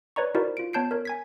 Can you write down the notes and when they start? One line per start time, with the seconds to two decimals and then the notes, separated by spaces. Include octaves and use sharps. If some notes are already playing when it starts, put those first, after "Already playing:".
0.16 B4 C#5 D5 A#5 C#6
0.35 D#4 E4 F#4 A#4 C5 D5
0.57 F4 D7
0.73 B3 C#5 A5 G6 C7 D7
0.91 A#4 C#5
1.05 G#5 G#6 B6